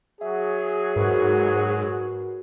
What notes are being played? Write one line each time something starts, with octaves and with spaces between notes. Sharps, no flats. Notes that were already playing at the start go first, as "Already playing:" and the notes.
F#3 G#4 E5
G#2 F#4 A#4 B4